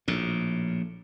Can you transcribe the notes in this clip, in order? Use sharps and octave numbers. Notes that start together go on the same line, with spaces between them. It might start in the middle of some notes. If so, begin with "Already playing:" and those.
A#1 A2